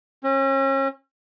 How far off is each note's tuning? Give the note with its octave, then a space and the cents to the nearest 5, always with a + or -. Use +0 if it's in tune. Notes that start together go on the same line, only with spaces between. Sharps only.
C#4 -35